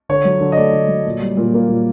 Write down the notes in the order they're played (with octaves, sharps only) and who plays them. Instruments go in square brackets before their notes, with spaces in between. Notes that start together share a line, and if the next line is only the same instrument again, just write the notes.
[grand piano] D3 C#5
F#3
D3
D#5
A3 D5
D3
F#3
A#2
G3
A#2
A#3
A#2